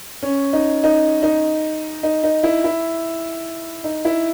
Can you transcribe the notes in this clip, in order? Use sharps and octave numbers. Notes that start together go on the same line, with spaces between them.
C#4
D#4
D#4
D#4
D#4
D#4
E4
E4
D#4
E4